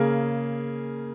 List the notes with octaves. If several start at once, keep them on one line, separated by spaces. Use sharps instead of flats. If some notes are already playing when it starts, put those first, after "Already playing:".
Already playing: C#3 A#3 G#4